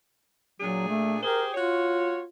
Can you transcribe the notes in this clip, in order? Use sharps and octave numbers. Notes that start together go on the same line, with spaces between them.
A#2 F#3 D4 G#4
A3
G4 G#4 A#4 C5
F4 F#4 C#5